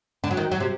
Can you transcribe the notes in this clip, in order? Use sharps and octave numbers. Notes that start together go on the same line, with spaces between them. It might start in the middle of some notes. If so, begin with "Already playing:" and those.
D3
F#3
D#3
F#3
C3